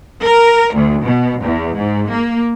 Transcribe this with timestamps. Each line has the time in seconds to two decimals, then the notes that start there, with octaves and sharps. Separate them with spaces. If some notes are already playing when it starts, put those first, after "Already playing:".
0.22 A#4
0.74 D2
1.04 B2
1.41 E2
1.75 G#2
2.09 A#3